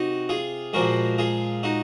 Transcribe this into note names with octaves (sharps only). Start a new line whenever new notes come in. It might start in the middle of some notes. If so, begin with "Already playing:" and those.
Already playing: C3 D#4 F#4
F4 G#4
A#2 F3 G#3 F#4 A#4
F4 G#4
D#4 F#4